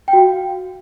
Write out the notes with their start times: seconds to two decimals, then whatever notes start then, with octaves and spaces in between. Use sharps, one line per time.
0.08 G5
0.13 F#4
0.19 F5